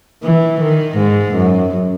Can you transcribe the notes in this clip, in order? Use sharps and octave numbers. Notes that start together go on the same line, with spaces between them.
E3
D#3
G#2
F#2